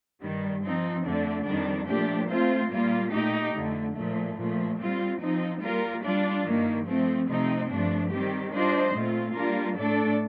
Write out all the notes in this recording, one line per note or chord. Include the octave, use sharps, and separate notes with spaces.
G2 D#3 G3
F3 C4 D#4
F2 D3 A3 D4
F2 D#3 G3 D4
A#2 F3 A3 D4 G4
A3 C4 F4 C5
A#2 G3 A#3 F4
A#2 A3 D#4 G4
F2 D3 A3
A#2 F3 A3
A#2 F3 A3
G3 C4 F4
F3 C4 D#4
G3 A#3 F4 A#4
G3 D4 F4
G2 D#3 A#3
F3 A3 C4
C3 F3 A3 C4 D#4
G2 F3 A3 D4
D#3 G3 C4 G4
G3 D4 F4 C5 D#5
A#2 A3 C4 F4
G3 A#3 D4 F4 A#4
A2 A3 D4 A4 D5